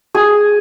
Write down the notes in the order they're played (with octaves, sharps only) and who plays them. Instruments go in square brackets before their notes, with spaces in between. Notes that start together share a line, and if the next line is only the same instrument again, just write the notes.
[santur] G#4